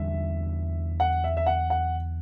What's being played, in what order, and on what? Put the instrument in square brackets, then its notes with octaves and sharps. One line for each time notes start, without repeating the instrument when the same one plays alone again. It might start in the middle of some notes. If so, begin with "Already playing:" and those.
Already playing: [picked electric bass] E2 D3 G3 D4 [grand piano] E5
[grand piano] F#5
E5
E5
F#5
F#5